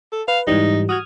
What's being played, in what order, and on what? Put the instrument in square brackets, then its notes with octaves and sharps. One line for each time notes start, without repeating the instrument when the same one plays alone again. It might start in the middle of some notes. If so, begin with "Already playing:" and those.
[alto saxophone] A4
[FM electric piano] B4 [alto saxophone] F5
[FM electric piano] G#2 E3 G3 [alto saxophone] D#4
[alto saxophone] F#4 [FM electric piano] D#6 F6 G#6